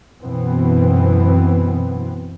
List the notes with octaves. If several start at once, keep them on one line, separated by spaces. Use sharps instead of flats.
F#2 B2 E3 B3 C4